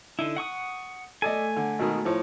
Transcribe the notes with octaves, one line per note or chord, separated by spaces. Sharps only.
D3 D#4 E4
F#5 C#6 D#6
A3 A4 D5 D#5 G#5
D3
G#1 B2 D#3
A2 F3